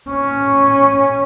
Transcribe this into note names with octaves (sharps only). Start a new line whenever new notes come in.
C#4